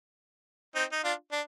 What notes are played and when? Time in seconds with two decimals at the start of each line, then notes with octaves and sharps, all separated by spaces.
0.75 C4 D#4
0.92 D#4
1.04 D4 F4
1.32 D4